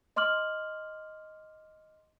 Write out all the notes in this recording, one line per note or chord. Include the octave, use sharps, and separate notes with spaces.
D#5 C6 D6 F6 F#7